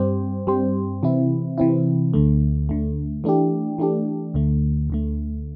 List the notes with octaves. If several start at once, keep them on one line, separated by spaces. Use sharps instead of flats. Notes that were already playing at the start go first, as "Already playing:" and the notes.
Already playing: G2 G3 C4 G4 C5
G2 G3 C4 G4 C5
C3 E3 C4 E4
C3 E3 C4 E4
D2 D3 A3
D2 D3 A3
E3 A3 D4 G4
E3 A3 D4 G4
D2 D3 A3
D2 D3 A3